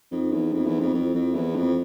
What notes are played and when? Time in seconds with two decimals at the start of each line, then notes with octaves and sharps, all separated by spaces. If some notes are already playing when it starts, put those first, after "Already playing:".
0.12 F2 D#4
0.32 E2
0.53 F2
0.66 E2
0.80 F2
0.94 F2 E4
1.15 F2
1.35 E2
1.56 F2